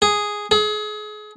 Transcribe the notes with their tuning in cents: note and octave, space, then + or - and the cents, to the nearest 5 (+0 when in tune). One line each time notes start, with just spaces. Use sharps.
G#4 +0
G#4 +35